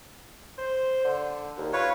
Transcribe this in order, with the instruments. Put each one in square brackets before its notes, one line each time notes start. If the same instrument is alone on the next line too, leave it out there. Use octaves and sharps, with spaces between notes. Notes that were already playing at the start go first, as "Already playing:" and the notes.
[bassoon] C5
D3
D#2
[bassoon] F4 [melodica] B4 C#5